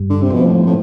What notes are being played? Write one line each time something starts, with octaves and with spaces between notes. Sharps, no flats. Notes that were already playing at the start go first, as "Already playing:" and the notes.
Already playing: G2
D3
C3
B2 F3 C4
A2
A2